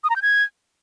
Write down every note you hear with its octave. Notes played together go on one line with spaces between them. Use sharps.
D#6
A#5
G6
G#6